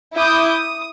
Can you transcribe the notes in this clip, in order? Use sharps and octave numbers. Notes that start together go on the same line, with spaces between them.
E4 E5 D6 D#6 G6
D#6